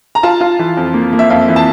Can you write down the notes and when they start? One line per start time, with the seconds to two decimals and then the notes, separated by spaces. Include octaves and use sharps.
0.15 A#5
0.23 F4 A5
0.41 F4
0.59 E3
0.77 F2
0.94 A#3
1.13 A#3
1.19 E5
1.30 F2 F5
1.48 E3
1.56 A5